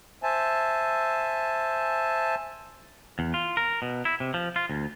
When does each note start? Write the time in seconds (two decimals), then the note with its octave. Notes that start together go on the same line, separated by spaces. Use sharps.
0.23 C5 E5 G#5 A5
3.19 E2
3.34 F4
3.57 A#4
3.82 B2
4.05 E4
4.20 C3
4.34 F3
4.56 F4
4.70 D2